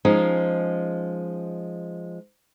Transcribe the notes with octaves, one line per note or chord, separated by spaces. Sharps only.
F3 G#3 C#4 D#4